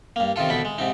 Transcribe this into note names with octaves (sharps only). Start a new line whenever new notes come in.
G2 A#3
C3 D#3 F4 A4
D2 B2 A4 B5
G#3
G#2 C3 D#4